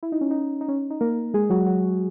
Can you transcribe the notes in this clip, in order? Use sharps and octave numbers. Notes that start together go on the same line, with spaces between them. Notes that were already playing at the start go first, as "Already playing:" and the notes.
E4
D#4
C#4
D#4
D#4
C#4
D#4
A#3 A#4
G#3 G#4
F#3 F#4
F#3 F#4